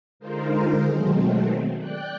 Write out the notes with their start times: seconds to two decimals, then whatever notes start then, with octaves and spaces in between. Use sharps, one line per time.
0.20 D3 G#3 D#4 F4 A#4 C5
0.84 B2 D#3 F#3 G#3 A3 C4
1.79 D5 G5 F#6